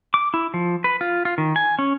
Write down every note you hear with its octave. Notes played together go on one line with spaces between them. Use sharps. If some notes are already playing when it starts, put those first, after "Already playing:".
D6
E4
F3
B4
F4
F4
D#3
G#5
C#4